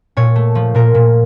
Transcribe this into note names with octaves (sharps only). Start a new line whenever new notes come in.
A#2 C#5
A3
F3
A#2 A#4
A#2